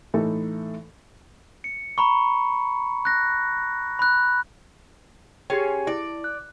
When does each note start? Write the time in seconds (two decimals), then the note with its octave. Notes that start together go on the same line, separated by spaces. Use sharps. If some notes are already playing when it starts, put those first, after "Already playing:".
0.14 A2 E3 A3 D#4 A4
1.64 C#7
1.98 A#5 B5 C#6
3.05 F#6 A#6
3.99 B5 F#6
5.50 C#4 G4 G#4 G5
5.87 E4 D5
6.24 F#6